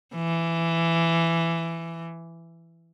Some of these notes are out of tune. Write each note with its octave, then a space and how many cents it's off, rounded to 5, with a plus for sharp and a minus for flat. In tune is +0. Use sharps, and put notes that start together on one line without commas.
E3 +15